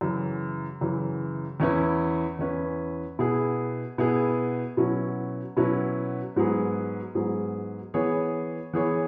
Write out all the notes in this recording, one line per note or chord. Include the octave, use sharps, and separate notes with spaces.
F#2 C#3 E3
F#2 C#3 E3
E2 E3 C#4 E4 B4
E2 E3 C#4 E4 B4
B2 B3 E4 G#4
B2 B3 E4 G#4
B2 F#3 C#4 E4 B4
B2 F#3 C#4 E4 B4
G#2 F#3 B3 G#4
G#2 F#3 B3 G#4
E3 B3 G#4 C#5
E3 B3 G#4 C#5